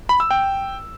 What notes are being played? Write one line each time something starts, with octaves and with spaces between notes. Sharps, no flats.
B5
E6
G5